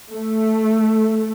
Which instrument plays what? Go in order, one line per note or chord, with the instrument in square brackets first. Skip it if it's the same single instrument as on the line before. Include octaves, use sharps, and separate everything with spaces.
[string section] A3